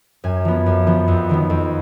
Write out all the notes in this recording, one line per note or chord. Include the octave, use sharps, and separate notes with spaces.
F#2 G#5
F3 B3
F#2
F3 B3
F2
D#3 F#3 B3
F2